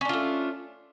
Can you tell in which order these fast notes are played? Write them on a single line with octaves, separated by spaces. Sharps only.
C#4 D4 F4 A3